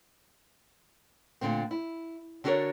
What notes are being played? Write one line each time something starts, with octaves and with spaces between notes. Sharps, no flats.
A#2 D3 A3 C4
E4
D3 D4 F#4 G#4 A#4 C#5